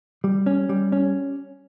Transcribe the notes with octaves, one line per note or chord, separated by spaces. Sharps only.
G3
C#4
G3
C#4